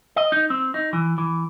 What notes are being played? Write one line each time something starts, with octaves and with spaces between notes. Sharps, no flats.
D#5
D#4
C4
D#4
E3
E3